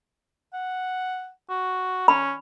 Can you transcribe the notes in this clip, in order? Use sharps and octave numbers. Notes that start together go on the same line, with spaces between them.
F#5
F#4
C#4 B5